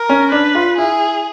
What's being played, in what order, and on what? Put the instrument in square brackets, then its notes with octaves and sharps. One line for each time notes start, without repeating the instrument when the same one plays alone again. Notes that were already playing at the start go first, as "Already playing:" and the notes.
Already playing: [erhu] A#4
[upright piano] C#4
[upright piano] D4 [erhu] B4
[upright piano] F4
[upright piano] E4 [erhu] G#4